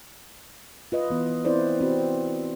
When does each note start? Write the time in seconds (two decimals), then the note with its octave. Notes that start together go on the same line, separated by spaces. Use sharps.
0.92 F4 B4 D#5
1.10 E3 B3
1.45 C4 E4 B4 C5 D5
1.81 C4 F#4